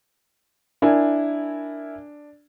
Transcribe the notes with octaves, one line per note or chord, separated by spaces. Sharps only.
D4 E4 A#4 G#5